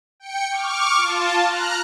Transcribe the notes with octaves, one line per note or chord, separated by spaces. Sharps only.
G5 C#7
C#6 D6 F6
F4 A5
A#5 F6 F#6